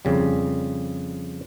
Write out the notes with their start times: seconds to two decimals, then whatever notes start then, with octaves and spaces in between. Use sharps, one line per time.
0.05 F2 C#3 G3